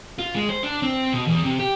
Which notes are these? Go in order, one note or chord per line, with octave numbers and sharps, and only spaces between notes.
F4
G#3
C5
D4
C4
B2
E2
C3
G4